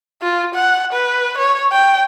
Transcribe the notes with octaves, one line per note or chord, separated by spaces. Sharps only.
F4
F#5
B4
C#5
G5